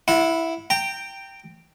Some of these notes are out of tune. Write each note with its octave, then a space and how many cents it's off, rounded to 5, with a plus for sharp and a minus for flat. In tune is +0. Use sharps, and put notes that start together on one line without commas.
E4 +0 F#5 -30
G5 +0 A#5 -30